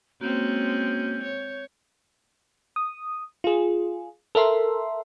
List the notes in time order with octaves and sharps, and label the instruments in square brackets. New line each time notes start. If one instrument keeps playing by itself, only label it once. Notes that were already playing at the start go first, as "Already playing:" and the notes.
[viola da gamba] G#3 C4 C#4 [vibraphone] A#3 F#4 [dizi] G6
[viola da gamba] C#5
[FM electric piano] D#6
F4 G#4
A4 A#4 E5 C6